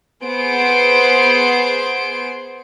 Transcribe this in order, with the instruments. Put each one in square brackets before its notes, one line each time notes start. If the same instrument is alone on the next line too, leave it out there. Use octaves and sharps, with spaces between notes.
[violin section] B3 G#4 C5 C6 D7